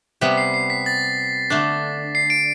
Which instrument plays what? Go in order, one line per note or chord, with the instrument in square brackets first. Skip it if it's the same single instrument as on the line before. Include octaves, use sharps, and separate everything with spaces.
[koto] C3 G3 B3 [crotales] B6
[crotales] C7
C7
B6
A6
[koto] D3 A3 D4
[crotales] C7
D7